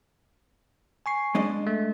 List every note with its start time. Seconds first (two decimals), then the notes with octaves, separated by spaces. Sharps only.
1.06 G#5 C#6 C7
1.35 G#3 D4 D#5
1.67 A3